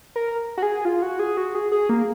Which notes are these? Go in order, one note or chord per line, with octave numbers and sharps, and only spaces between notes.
A#4
F#4
G#4
F4
F#4
G#4
F#4
G#4
G#4
A#3